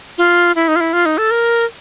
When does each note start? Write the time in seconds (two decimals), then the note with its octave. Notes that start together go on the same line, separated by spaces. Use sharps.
0.18 F4
0.55 E4
0.68 D#4
0.76 F4
0.81 E4
0.93 F4
1.06 D#4
1.18 A4
1.31 A#4